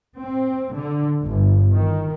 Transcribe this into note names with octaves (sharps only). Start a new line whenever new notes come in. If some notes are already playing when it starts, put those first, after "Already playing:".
C4
D3
G1
D#3